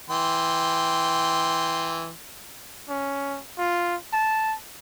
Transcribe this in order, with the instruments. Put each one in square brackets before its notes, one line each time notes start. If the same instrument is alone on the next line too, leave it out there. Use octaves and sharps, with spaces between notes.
[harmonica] E3 G5 C6
[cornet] C#4
F4
A5